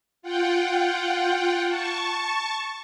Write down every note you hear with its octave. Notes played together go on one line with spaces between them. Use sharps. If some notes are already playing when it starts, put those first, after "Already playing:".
F4 F#5 G5
A5 C#6